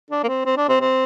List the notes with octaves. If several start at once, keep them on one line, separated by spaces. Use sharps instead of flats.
D4
A#3
C4
C4
D4
C4
C4